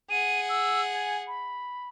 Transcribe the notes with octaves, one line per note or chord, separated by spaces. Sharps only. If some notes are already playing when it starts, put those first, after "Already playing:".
G#4 F#5 D#7
E6
G#5
B5